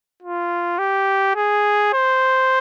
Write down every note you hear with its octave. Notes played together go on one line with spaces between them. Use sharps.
F4
G4
G#4
C5